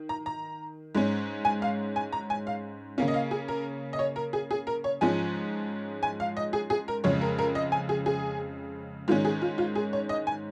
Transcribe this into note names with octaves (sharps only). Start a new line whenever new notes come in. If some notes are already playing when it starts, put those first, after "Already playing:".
Already playing: D#3
A#5
A#5
G#2 G#3 C#4
G#5
F5
G#5
A#5
G#5
F5
C#3 A#3 C#4 F5
D#5
F5
G#4
A#4
D#5
C#5
A#4
G#4
G#4
A#4
C#5
G#2 F3 G#3 C#4 G#5
G#5
F5
D#5
G#4
G#4
A#4
F2 C#3 G#3 C#5
A#4
A#4
D#5
G#5
G#4
G#4
G#2 D#3 G#3 C#4 F4
G#4
F4
F4
G#4
C#5
D#5
G#5